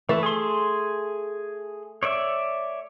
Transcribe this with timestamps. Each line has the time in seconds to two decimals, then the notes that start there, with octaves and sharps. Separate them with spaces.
0.09 E3 A3
0.23 G#4 C6
2.03 C#5 D5 E5